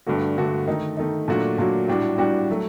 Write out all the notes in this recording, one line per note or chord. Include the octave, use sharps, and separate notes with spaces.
G2 D3 A3 D4 F#4
G2 D3 A3 D4 F#4
D#3 A3 D#4
D#3 A3 D#4
A#2 F#3 A3 D4 F#4
A#2 F#3 A3 D4 F#4
A2 G3 D4 F#4
A2 G3 D4 F#4
F#3 A3